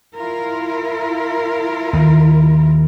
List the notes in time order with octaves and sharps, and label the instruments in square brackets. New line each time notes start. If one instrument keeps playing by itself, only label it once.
[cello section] E4 F4 A#4
[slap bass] D#2 D#3